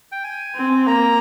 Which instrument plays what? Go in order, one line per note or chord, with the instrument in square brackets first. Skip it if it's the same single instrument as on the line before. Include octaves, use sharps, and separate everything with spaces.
[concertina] G5
G#5
[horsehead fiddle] C4
[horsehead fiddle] A#3 [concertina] A#5